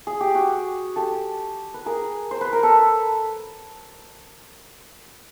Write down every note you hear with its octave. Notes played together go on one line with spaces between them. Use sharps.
G#4
G4
F#4 G#4
G4 A4
B4
G#4 A#4
C5
B4
A#4
A4 B4